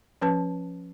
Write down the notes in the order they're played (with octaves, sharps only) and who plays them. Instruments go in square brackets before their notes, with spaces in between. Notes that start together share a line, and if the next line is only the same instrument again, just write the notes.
[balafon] F3 C#4 B4 A5